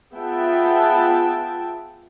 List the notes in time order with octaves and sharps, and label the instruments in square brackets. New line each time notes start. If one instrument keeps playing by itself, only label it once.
[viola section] B3 F4 G#4 E5 G5 A5